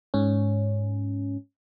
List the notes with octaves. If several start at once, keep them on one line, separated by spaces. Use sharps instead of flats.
G#2 C#4